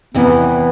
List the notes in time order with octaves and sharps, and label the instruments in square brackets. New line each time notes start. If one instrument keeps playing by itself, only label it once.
[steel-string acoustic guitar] E2 C3 E3 [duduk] B3